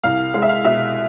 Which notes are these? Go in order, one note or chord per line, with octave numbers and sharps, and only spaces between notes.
C2 F5
G#3 F5
E5
F5
B2 E5